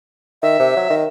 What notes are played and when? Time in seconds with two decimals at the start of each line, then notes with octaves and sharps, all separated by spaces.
0.43 D#3 E5
0.59 C3
0.76 F#3
0.90 D#3